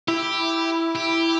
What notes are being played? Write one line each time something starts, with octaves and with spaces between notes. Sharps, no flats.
E4 G4
G4